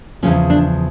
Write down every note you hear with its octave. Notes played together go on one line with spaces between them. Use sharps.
E2 C#3 F3 C#4
D4